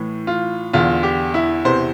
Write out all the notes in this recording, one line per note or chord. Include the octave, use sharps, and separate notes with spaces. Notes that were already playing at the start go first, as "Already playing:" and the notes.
Already playing: A2 E3
F4
E2 D3 F4
G4
E4
E2 C3 E3 C5